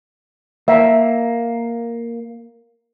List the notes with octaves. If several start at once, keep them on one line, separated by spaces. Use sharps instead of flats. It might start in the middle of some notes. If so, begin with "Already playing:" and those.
A#3 E5